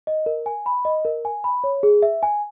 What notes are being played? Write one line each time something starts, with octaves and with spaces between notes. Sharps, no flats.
D#5
A#4
G#5
B5
D#5
A#4
G#5
B5
C#5
G#4
E5
G#5